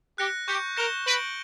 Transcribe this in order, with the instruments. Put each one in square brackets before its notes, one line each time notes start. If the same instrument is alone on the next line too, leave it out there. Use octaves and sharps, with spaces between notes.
[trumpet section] G4 [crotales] F#6 A#6 C#7
[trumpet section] G4 [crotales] C#6 G6 C#7
[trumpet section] A#4 [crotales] A#6 C#7 E7 G7
[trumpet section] B4 [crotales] A#6 D7 F#7